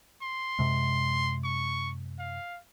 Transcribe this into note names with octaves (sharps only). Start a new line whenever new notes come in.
C6
F#2 C3 G#3
C#6
F5